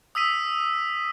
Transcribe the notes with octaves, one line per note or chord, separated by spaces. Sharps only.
D#6 E6 B6 D#7